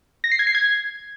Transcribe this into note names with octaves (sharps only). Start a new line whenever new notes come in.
A#6
C7
G#6
C7
G#6